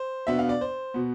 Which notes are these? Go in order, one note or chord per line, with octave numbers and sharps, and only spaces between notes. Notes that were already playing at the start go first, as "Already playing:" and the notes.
Already playing: C5
B2 B3 D4 E5
F5
D5
C5
B2 B3